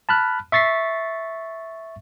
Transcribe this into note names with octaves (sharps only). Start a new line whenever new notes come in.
A5 B5 F6 F#6
E5 C#6 A6 B6 C7